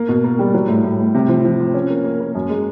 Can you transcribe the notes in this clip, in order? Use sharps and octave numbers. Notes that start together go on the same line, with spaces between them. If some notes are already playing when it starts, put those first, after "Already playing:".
Already playing: A#3
B2
A#3
G3
F#3
A2
A2
A2
C3
F3
F3
F3
C#4
A#3
A#3
A#3
F#2
G#3